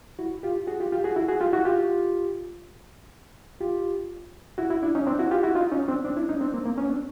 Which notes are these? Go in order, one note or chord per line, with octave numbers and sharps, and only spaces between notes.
E4 F#4
F4 G4
F#4 G#4
F4 G4
F4 G4
F#4 G#4
E4 F#4
F#4 G#4
F4 G4
E4 F#4
F4 G4
F4 G4
E4 F#4
E4 F#4
D4 E4
C#4 D#4
C4 D4
E4 F#4
F4 G4
E4 F#4
D#4 F4
C#4 D#4
C4 D4
C4 D4
D4 E4
C#4 D#4
C4 D4
A#3 C4
A#3 C4
B3 C#4
C4 D4